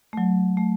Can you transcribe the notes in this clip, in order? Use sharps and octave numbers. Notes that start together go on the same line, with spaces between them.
A3
F#3
A3